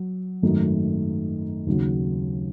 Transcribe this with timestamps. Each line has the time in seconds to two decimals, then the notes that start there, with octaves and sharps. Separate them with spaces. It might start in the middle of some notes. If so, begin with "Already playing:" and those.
Already playing: F#3
0.42 G#1 F#2 D#3 A3 D#4
1.67 D#2 C#3 F#3